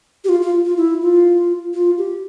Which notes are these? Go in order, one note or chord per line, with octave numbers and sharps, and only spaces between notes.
G4
F4
F4
F4
E4
F4
F4
G4